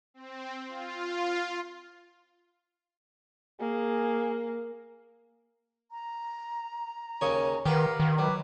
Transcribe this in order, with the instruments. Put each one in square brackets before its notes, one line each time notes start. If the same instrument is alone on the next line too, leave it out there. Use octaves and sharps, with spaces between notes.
[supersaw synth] C4
F4
[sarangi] A#3 [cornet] G#4
[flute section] A#5
[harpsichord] D#2 C#3 C#5
[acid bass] D#3 [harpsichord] G4 B4 [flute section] A#4 F5 F#5
[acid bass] D#3
[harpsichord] F#3 [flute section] B4 D6